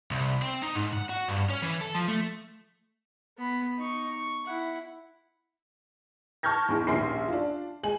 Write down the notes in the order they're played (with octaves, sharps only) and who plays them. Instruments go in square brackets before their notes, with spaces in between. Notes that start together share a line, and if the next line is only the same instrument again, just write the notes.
[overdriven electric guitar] C2
C4
D#4
G#2
F#5
F#4
G2
C#4
E3
A4
F3
A3
[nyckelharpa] B3 B5
D#4 C#6
C#6
E4 F#5
[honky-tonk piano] A5 C#6 F6 G6 G#6 A#6
E2 G#2
A#1 D#2 C#4 C6 C7
D4 F4
G#3 G#5 F#7